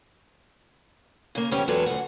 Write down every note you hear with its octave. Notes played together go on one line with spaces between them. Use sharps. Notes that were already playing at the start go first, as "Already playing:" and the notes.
C#3 A#3
F2 C#3 G3 B3 C#4 G4
E2 F#3 G#3 A4 B4 A5
D2 F#5